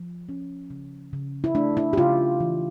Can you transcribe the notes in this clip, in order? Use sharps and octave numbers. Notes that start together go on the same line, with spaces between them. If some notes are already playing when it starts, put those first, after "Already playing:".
Already playing: F3
C#4
C#3
C#3
E4
A3 D4
E4
G4
C#3 F4
E3